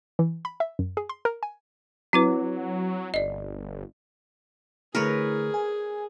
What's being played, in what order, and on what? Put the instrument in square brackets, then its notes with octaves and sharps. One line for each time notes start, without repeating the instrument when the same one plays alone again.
[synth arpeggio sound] E3
B5
E5
F#2
G#4
C6
A#4
G#5
[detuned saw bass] F#3 [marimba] C4 E4 B4
[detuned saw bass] G1 [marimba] D5 D#5
[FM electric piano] D3 A3 E4 [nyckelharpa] G#4 [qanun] A#4 B4 C#5
[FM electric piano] G#5